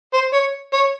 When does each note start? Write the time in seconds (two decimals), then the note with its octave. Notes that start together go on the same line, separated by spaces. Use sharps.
0.14 C5
0.33 C#5
0.73 C#5